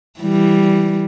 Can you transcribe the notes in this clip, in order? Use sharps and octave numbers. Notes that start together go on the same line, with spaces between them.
E3 G3